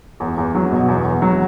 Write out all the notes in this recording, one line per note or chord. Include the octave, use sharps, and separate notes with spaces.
E2
E2
F#3
B2
E2
E2
F#3